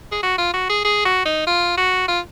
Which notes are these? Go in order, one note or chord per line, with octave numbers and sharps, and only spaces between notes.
G#4
F#4
F4
F#4
G#4
G#4
F#4
D#4
F4
F#4
F4